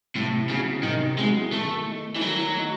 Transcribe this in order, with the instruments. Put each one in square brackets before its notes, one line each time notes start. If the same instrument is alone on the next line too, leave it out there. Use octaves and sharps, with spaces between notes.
[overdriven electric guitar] A2 [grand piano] C3
[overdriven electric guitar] C#3 [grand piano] F#3 C4 E4
[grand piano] C3 [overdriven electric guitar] D#3
[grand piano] F#3 C4 E4 [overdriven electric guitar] G#3
[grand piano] D#3 [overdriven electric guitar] A3
[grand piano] A3 D#4
[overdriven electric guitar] E3
[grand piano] D#3 [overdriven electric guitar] F#3
[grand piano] A3 D#4